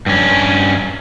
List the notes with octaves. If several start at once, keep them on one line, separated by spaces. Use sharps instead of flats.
G2 C#4